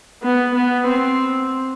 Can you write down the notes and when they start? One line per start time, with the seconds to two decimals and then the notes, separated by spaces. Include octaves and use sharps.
0.23 B3
0.55 B3
0.88 C4